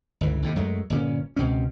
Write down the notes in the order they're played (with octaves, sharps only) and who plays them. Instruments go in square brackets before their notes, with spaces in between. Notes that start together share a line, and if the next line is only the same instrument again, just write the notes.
[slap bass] G1 C#2 E3
D#2 A2 C3
F#2 F#3 G#3 A3
G1 A#2 D3 C#4
C#2 B2 C4 C#4